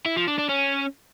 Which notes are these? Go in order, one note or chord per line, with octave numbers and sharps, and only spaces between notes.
E4
F3
D4
D4
C#4